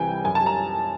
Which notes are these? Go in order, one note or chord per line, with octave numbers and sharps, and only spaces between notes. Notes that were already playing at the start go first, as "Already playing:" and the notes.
Already playing: C2 C3 E3 G5 G#5
G3
F#2 G#5
A5
G3 A#5